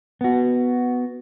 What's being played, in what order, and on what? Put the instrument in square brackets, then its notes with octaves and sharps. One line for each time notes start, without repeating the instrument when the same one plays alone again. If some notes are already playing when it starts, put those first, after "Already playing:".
[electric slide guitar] B3 F#4